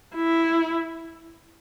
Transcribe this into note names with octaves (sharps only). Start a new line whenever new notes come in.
E4